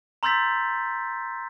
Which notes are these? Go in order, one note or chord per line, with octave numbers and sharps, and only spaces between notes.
A#5 C6 E6 G6 A6 B6